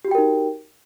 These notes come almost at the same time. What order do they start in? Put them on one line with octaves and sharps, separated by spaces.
G4 F#4 G5 A#4 D#4